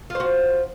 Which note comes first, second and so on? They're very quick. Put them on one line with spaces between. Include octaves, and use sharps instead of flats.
F4 C5 F#4